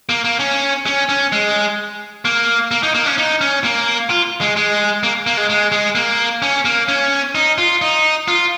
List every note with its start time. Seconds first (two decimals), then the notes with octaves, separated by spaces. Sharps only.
0.09 A#3
0.24 A#3
0.39 C#4
0.86 C#4
1.09 C#4
1.32 G#3
2.25 A#3
2.71 A#3
2.83 D#4
2.94 A#3
3.06 C#4
3.18 D#4
3.41 C#4
3.64 A#3
4.10 F4
4.41 G#3
4.56 G#3
5.03 A#3
5.27 A#3
5.37 G#3
5.49 G#3
5.72 G#3
5.95 A#3
6.42 C#4
6.65 A#3
6.88 C#4
7.35 D#4
7.58 F4
7.82 D#4
8.28 F4